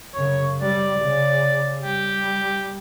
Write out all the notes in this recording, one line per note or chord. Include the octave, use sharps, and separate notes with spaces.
F#2 C#3 C#5
G3 D5
C#3
G3 G4